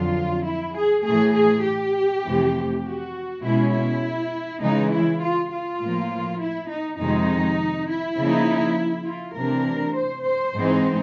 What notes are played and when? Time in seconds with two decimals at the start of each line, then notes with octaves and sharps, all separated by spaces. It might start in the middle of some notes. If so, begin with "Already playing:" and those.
Already playing: F2 D3 F#3 F4
0.47 E4
0.77 G#4
1.05 A2 E3 A3 G#4
1.36 G#4
1.65 G4
2.25 F2 C3 E3 A3
2.84 F#4
3.43 B2 G#3 C#4 E4
3.73 E4
4.62 C#3 E3 G#3 D#4
4.91 E4
5.22 F4
5.51 F4
5.81 A2 F3 A#3
6.41 E4
6.70 D#4
6.99 F2 C3 D#3 G#3 D#4
7.89 E4
8.18 C#3 F3 A#3 D#4
9.07 F4
9.37 C3 E3 A3 D4 A#4
9.97 C5
10.26 C5
10.56 G#2 E3 G#3 C4 D#4